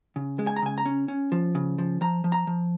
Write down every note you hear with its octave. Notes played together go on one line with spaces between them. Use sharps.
C#3
G#3
G#5
A#5
C#3 G#5
A#5
C#4
C#4
F3
C#3
F3
F3 A#5
F3
A#5
F3